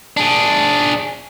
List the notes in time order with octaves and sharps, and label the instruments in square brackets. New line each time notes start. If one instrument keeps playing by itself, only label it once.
[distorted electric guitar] D4 G#4